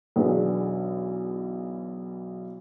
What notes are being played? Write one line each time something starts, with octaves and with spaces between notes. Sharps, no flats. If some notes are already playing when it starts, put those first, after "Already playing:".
B1 E2 D4 G#4 B4